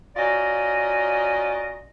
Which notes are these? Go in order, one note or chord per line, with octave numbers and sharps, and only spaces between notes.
C#4 F4 F#4 D5 D#5 A#5